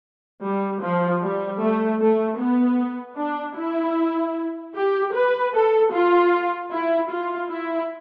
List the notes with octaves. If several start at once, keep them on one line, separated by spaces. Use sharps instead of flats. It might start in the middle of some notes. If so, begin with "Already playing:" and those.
G3
F3
G3
A3
A3
B3
D4
E4
G4
B4
A4
F4
E4
F4
E4